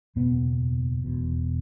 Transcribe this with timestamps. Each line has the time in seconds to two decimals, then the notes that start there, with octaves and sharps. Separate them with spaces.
0.16 F#1 E2 B2 B3
1.04 E1 E2 B2